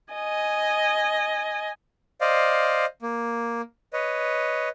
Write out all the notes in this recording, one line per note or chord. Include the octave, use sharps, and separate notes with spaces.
D#5 G#5
C5 D5 D#5 F5
A#3
B4 C#5 D#5